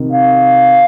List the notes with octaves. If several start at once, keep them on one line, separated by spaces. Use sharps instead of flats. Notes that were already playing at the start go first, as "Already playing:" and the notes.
Already playing: C3 D#3
F5